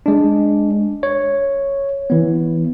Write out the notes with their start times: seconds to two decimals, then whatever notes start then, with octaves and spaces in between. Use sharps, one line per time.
0.06 G#3 D4
1.03 C#5
2.10 E3 B3